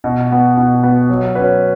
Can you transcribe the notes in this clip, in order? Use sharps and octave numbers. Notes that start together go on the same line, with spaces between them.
B2
B3 F#4
B2
B3 F#4
F#3
C#4 F#4 B4